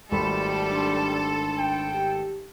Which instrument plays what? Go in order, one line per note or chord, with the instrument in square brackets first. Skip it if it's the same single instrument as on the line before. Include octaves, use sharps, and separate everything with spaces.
[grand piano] G#1 A3 B5 [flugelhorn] G3 [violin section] A4 [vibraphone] C6
[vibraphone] D4 A5 C6
[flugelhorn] G5
[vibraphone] G4